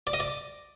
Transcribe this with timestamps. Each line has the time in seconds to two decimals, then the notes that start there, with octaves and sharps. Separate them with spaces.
0.07 D5
0.13 D#5
0.20 D5